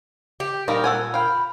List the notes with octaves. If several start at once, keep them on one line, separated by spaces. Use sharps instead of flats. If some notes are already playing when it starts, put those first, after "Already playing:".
G4
A#2 D#3 G3 A#4
A4 F#5 G#5
F5 G5 B5